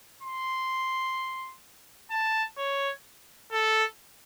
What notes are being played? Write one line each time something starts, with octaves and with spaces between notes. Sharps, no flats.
C6
A5
C#5
A4